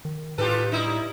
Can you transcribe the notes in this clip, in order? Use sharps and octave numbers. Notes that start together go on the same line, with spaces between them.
D#3
A2 G#3 D#4 F4 G4 A4 B4
C#3 G3 D#4 E4 E5